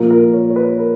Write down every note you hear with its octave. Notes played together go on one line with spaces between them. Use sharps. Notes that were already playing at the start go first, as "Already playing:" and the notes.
Already playing: A#2 F3 A#3 A#4
A#4
C#5
C#5
B4
A#4